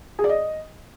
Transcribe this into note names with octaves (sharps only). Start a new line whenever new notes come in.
G#4
D5
D#5